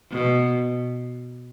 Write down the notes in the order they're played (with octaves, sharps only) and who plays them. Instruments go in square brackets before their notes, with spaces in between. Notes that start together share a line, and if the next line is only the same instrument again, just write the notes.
[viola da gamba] B2